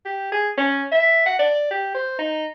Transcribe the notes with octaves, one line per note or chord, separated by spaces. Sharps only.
G4
G#4
C#4
E5
F#5
D5
G4
C5
D#4